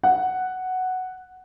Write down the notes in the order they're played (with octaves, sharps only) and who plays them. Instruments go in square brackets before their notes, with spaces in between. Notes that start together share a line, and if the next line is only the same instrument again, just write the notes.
[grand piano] F#5